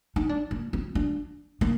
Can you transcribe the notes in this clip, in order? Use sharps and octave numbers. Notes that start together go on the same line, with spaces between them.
D#4
D4
A#3
C4
D4
A#3